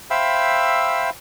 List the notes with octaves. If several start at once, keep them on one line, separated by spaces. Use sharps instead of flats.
C5 E5 F5 G5 B5 E6